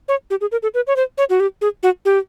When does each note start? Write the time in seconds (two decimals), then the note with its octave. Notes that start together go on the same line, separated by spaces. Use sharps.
0.08 C#5
0.30 G4
0.41 G#4
0.52 A#4
0.63 A4
0.74 B4
0.87 C#5
0.96 C5
1.18 C#5
1.30 F#4
1.40 G4
1.61 G#4
1.83 F#4
2.05 G4